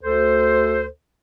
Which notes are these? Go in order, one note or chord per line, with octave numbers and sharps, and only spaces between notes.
D2 A4 C5